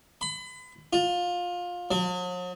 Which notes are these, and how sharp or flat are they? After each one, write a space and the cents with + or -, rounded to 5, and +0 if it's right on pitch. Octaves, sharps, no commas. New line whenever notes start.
B5 +35
F4 +20
F#3 -45